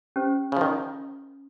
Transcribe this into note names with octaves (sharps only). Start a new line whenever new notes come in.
C#4 G4 C5
C#3
F3
D#3